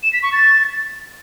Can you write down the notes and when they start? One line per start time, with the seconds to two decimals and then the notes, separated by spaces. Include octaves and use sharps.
0.03 E7
0.13 B6
0.23 C#6
0.33 A6